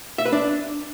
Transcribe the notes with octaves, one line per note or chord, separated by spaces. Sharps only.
E5
B4
D4